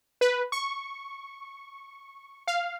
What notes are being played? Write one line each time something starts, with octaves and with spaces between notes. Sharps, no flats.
B4
C#6
F5